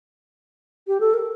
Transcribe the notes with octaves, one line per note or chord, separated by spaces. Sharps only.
G4
A4
A#4